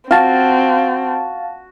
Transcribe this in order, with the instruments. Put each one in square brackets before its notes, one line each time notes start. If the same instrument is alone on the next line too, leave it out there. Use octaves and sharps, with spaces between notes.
[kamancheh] C4 [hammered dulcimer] F#4 [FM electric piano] F5 A5